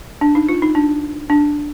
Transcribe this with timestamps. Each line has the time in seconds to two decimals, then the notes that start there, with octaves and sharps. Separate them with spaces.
0.21 D4
0.35 D#4
0.49 F4
0.62 D#4
0.75 D4
1.30 D4